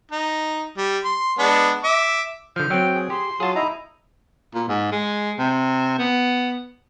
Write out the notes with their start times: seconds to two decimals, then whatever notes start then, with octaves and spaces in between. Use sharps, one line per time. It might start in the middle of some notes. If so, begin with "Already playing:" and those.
0.12 D#4
0.78 G3
1.05 C6
1.39 G#3 B3 D4
1.84 E5 D6
2.56 D3 F3 F6 G6
2.70 F#3 C4 G5
2.95 G#4
3.10 G4 C6
3.40 F#3 F4 G#4 A5
3.55 D#4 E4 D#5 A#5
4.54 A#2
4.68 G#2
4.92 G#3
5.39 C3
5.98 B3